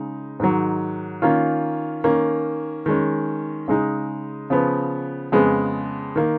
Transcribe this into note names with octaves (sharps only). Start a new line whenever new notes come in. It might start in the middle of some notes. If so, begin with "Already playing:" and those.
Already playing: C#3 G#3 D#4
G#2 D#3 F#3
D#3 A#3 C#4 F4
D#3 A#3 C#4
D#3 G#3 C#4
C#3 G#3 D#4
C#3 F3 B3
F2 C#3 G#3 B3
D#3 A#3